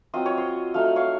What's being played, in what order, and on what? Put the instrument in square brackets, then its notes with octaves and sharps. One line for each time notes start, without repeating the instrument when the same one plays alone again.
[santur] F#3 C4 F4 D#5
C#5
C5 D#5
F#3 A3 D#4 F5
F#5
C#5 F5